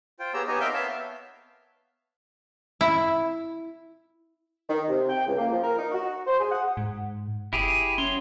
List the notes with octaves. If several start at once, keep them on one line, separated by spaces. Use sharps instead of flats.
F4 C5 G5
B3 G4 G#4 C#5 A#5 E6
B3 D#4 G4 C#5 D#5 G#5
C4 A#4 E5 F5 G5 G6
B3 C#5 E5 F5 A5
E4
D#3
C3
G5
C#2
A#3
F3
A#4
D#4
F#4
C5
G#4
F#5
G#2
F#1 E4 G4 G#4
F#3 C#4 C#5 C6